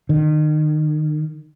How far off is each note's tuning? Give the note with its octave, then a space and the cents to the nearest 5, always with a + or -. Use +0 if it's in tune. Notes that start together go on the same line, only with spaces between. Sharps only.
D#3 -30